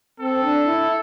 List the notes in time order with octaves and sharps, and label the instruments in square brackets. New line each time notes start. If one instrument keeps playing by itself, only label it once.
[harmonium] C4 [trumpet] A4
[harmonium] D4
E4